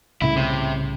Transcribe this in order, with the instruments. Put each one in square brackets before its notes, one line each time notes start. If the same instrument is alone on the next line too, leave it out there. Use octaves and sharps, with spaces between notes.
[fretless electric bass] C2 A2 C#3 [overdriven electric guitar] E4
[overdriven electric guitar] C3